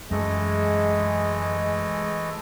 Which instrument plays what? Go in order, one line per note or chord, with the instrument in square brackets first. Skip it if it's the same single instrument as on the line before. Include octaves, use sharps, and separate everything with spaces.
[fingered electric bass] F#2 [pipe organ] E3 A3 D#5 [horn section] G#3